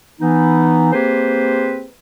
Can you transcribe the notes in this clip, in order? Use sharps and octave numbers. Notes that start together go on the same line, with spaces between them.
E3 B3 D#4
A#3 C4 G4 G#4 B4 C5